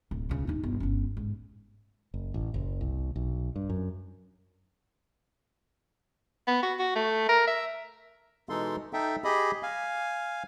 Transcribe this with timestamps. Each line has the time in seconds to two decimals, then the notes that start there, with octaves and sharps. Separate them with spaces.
0.11 D1
0.29 C#2 C#3
0.47 D#2 D#4
0.63 G1
0.80 G1 C#4
1.17 G#2
2.14 F#1
2.34 A1
2.54 F#1
2.81 C2
3.16 B1
3.56 G2
3.70 F#2
6.47 B3
6.63 F#4
6.79 F#4
6.95 A3
7.29 A#4
7.47 E5
8.49 B2 E3 G#3 D#4 A4 C6
8.93 D#4 A4 E5 G5
9.24 G4 G#4 D#5 B5
9.63 F5 G#5